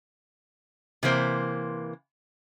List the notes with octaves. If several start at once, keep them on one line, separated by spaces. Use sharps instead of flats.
C3 E3 A#3 C5